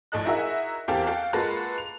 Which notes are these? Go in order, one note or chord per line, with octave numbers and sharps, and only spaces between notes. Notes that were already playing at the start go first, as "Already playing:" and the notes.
A#1 A2 A4 D#5 F#6
D#4 E4 F#4 G#4 A#4 E5
E2 A#3 C4 G4 A4 F5
F#4 A4 F5 G5
G#3 A#3 F4 F#4 A4 B4
F7